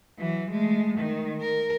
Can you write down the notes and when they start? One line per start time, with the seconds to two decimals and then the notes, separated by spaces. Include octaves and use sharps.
0.19 E3 F#3
0.50 G#3 A3
0.99 D#3
1.41 A#4